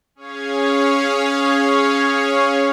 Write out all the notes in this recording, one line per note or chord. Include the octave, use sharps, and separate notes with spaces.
C#4 G#4 C#5 F5